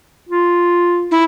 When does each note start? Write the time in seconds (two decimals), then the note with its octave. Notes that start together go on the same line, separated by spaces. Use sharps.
0.29 F4
1.11 E4